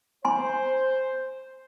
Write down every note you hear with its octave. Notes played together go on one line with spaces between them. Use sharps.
C5 G#5 C6